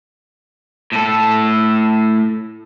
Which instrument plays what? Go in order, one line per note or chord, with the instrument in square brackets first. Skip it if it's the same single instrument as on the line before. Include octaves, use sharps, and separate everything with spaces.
[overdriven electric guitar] A2 A4